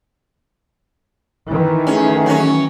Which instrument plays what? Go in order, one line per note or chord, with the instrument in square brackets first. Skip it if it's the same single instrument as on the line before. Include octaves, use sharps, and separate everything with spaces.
[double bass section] D#3 E3
[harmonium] A3 G#4 [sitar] C#4
[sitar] F#3 C#4